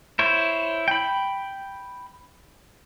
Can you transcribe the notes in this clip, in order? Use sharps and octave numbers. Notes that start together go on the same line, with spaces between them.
E4 C5 C#5
G5 B5